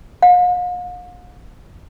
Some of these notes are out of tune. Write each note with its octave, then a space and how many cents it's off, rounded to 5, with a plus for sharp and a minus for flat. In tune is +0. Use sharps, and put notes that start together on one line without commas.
F5 +45